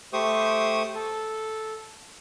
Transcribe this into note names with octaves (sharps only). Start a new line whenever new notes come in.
A3 G4 C5 C#6 D#6
A4